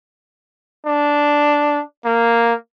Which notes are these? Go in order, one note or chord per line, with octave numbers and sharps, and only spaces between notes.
D4
A#3